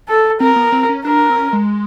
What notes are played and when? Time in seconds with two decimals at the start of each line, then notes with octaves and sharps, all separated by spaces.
0.08 A4
0.40 C4 A#4
0.56 B3
0.72 C4
0.89 C#4
1.05 D4 A#4
1.30 C4
1.37 C#4
1.53 G#3